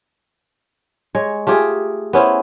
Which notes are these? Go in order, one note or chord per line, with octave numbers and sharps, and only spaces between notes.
G#3 C#5
A3 F4 G4 G#4
B3 C#4 E4 C5